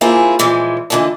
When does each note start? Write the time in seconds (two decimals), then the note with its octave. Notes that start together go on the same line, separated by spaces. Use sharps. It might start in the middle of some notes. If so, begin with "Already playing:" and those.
0.01 A#3 C4 E4 F4 G#4
0.39 A#2 E3 F3 G#3
0.90 A#2 D3 E3 D#5 A5